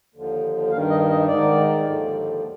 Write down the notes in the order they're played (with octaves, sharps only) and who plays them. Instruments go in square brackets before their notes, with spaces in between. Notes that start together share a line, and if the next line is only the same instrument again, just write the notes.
[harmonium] D#2 D3 F3
G2 D#3 F5
D#5
D#5
G#2 D#3 D5
D#2 D3 F3